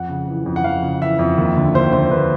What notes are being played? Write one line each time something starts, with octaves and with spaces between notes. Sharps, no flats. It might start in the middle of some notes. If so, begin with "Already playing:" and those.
Already playing: F2 F#5
C#3
E3
F2
F#5
F2 F5
C#3
E3 E5
F2
D#2
D3
D#2 C5
D3 C5
D#2 B4